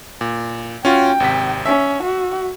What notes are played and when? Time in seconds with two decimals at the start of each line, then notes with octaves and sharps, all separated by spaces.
0.21 A#2
0.85 C#4 F4 F#4 G5
1.20 G#1 C3 B6
1.66 C#4 E5
2.03 F#4